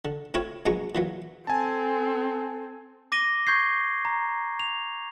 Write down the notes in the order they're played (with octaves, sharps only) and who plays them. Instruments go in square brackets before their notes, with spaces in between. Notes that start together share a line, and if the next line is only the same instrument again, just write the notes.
[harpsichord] D3
A2 C4 E4 F4 C#5
A#1 B2 F#3 G#3 A#5 C#6
A#2 E3 F#3
[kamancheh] C4 A4 [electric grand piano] G#5 A5
[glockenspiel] D6 A#6 D#7 G7
C#6 G6 G#6 C7
A#5
F7